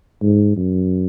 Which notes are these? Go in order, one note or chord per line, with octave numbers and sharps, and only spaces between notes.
G#2
F#2